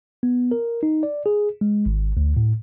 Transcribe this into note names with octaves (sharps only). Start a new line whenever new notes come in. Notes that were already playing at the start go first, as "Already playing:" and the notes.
B3
A#4
D#4
D5
G#4
G#3
G#1
D2
A2